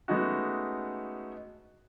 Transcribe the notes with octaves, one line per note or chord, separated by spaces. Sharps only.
G#3 A3 B3 C#4 D#4 F#4